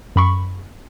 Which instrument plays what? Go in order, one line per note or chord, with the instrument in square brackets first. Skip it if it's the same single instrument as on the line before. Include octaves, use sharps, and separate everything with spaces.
[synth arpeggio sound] F#2 B5 C#6